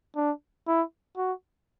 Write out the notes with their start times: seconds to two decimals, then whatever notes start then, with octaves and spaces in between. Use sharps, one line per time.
0.16 D4
0.67 E4
1.17 F#4